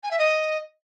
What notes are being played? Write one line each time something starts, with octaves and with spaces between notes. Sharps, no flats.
G#5
E5
D#5